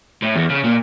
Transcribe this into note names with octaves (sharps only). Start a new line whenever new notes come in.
A2
E2
C#3
A#2